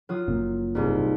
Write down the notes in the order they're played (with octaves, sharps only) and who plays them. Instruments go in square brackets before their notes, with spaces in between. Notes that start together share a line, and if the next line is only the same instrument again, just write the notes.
[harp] F#3 F4 D#6
[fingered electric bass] F#1 A#2
[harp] C2 G#2